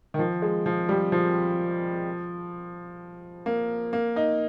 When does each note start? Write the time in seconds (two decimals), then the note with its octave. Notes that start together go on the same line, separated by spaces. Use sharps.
0.14 D#3
0.19 F3
0.42 G#3
0.66 F3
0.89 G3
1.12 F3
3.46 A#3
3.93 A#3
4.16 D#4